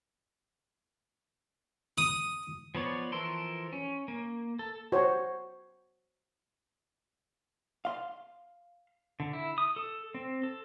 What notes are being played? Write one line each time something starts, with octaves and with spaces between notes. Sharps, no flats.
D#6
F3 B3 C#5 D5
E3 F3 A4 A#4 C6
C#4
A#3
A4
F#4 C5 C#5
F5 C6
D3
E4
D#6
A4
C4
A4